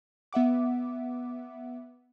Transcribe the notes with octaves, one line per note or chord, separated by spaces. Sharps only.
B3 E5 F#5 D6